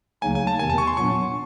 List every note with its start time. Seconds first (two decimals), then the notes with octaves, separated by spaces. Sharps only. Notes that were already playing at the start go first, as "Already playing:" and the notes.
0.22 D2 C#3 F#3 A#3 D#4 G#5
0.35 G#5
0.47 A5
0.59 E2 C3 D#3 G#5
0.70 A5
0.78 C#6
0.87 C6
0.97 A#2 F#3 B3 D4 C#6